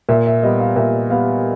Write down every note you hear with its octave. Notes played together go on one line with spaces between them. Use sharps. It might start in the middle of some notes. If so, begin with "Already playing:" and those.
A#2 E5
E5
G3 B3 D#5
F5
A#2 E5
G3 B3 F5